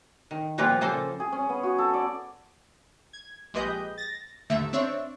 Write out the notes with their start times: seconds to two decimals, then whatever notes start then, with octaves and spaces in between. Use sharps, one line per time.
0.31 D#3
0.58 A#2 F3 G3 A#3 B3 F4
0.81 C#3 A#3 A4 C5
1.20 G#4
1.32 C#4
1.49 B3
1.63 F#4
1.78 A4
1.94 D5
3.13 G#6
3.54 A#1 G#3 G4 B4 D#5 G6
3.98 A6 A#6
4.50 D#2 G#2 D3 A3 E5
4.73 C4 D4 C#5 E5